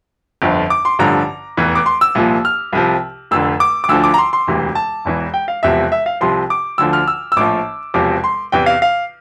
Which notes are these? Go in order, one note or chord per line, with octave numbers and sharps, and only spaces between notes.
G1 F2 D3 F3
D6
C6
A1 G2 D3 F3 A#5
F1 E2 E3
D6
C6
E6
C2 A#2 F3
F6
C2 C3 F3
F1 F2 D3 E6
D6
D6
D2 D3 F3 E6
D6
A#5
C6
C6
E1 D2 C3 E3
A5
E1 E2 E3
G5
F5
E1 E2 C3 F3 E5
E5
F5
C2 C3 F3 C6
D6
D2 D3 F3 E6
F6
E6
E6
A#1 A2 F3 D6
E1 E2 C3 F3 D6
C6
E2 C3 E3 G5
F5
F5